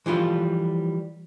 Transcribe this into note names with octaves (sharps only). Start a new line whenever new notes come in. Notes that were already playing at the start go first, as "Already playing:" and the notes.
E3 F3 G3 F4 A4